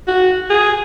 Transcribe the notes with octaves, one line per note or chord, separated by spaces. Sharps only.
F#4
G#4